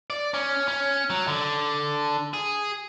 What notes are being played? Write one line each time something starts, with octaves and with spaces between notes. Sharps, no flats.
D5
C#4
C#4
F#3
D3
G#4